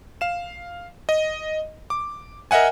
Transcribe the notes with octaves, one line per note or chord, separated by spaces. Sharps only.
F5 E7
D#5
D6
A#4 D#5 E5 F#5 G#5